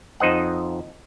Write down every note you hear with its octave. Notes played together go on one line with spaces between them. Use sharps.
F2 D#4 C5 D#5 F#5